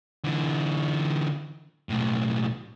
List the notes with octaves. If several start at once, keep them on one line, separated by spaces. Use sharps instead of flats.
D3 E3
B1 A2